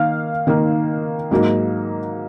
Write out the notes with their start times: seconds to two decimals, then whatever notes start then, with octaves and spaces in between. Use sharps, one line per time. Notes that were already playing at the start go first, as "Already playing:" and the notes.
Already playing: D#3 A#3 F5
0.47 D#3 A#3 D#4
1.31 G#2 F#3 A#3 D#4